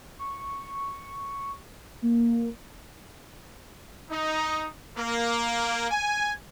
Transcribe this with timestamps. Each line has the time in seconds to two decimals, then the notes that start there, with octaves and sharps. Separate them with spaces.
0.19 C#6
2.02 A#3
4.11 D#4
4.97 A#3
5.90 G#5